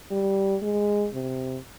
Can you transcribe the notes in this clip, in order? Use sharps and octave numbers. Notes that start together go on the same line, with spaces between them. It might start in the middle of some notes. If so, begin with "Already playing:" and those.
G3
G#3
C3